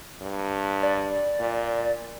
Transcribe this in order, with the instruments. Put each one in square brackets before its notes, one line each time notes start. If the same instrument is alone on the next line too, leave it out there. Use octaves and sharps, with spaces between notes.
[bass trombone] G2
[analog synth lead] D5
[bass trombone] A#2